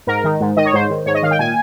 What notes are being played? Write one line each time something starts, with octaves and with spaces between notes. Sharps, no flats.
G#2 A#4
D#3
G#2
D#3 D#5
C#5
G#2 C5
D#3
G#2 C#5
D#5
D#3 F5
G5
A#2 G#5